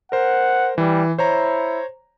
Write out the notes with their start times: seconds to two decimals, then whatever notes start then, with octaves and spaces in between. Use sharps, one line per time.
0.12 A#4 C5 F#5
0.78 E3 G3
1.18 E4 C5 C#5 A#5